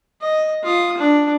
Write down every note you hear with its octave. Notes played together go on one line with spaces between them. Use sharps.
D#5
F4 D#6
D4